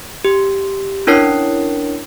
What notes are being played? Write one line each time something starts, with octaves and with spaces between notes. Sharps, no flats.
G4
C#4 D4 E4 A#4 C#5 C7